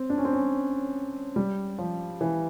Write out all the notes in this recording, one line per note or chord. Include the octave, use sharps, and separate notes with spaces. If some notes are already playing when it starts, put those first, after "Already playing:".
Already playing: C4
D4
C#4
C4
C#4
G3
F3
E3